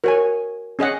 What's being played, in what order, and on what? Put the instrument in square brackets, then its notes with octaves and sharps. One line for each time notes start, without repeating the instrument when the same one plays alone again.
[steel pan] F#4 C#5 G#5 [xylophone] A#4
[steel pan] C#4 G#4 D#5 F#5